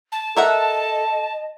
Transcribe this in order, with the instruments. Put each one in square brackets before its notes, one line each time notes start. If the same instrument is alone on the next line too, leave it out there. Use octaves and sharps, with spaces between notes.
[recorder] A5
[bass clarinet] A4 [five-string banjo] A#4 E5 F#5 [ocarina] D#5